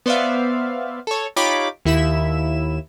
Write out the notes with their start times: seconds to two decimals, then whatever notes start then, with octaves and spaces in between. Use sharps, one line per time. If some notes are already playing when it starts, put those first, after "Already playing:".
0.06 B3 C5 D5 E5 F5
1.07 A4 C#5
1.36 D#4 F4 G4 C#5 B5 D6
1.85 D#2 E4 E5 E7